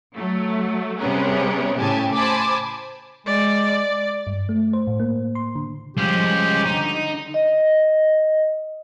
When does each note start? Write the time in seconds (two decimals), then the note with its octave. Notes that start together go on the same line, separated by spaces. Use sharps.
0.15 F#3 A3
0.99 C3 G3 B3 C#4 G#4 A#4
1.78 A2 C#3 A3 G4 G#5 A5
2.12 C5 G#5 A5 B5 D6
3.27 G#3 D5
4.27 G2
4.49 A3
4.73 C5
4.87 A2
5.00 A#3
5.35 C6
5.55 D3
5.97 F3 G3 G#3 C#4 G4
6.65 D3 D#4
7.34 D#5